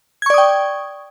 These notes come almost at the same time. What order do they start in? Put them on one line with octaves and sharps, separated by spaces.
G#6 C#6 D5 D#6 G5